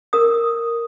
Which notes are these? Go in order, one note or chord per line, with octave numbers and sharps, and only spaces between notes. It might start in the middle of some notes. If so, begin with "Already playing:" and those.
A#4 D#6